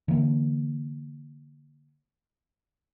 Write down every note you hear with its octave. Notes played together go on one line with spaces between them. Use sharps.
D3 E3 A#3